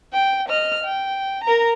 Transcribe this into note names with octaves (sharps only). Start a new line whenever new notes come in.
G5
D#5 F6
G5
A#4 A#5